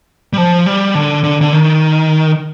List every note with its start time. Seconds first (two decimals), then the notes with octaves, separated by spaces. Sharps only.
0.33 G3
0.38 F3
0.66 G3
0.95 D3
1.24 D3
1.41 D3
1.53 D#3